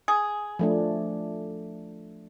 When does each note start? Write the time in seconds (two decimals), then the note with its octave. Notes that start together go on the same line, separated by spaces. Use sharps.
0.08 G#4
0.59 F3 A3 D4